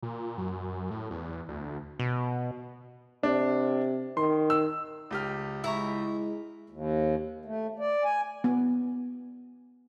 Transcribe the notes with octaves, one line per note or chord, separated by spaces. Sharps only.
A#2
F#2
A2
E2
D2
B2
C3 D4
D#3 C6
E6
C#2 G4 F6
G#3 E4 E5 A#5 C#6
D#2
A3
D5
G#5
B3